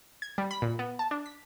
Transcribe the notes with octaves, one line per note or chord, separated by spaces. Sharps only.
G#6
G3
B5
A#2
B3
A5
D4
B6